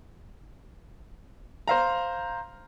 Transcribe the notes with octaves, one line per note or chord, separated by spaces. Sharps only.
C5 F5 A#5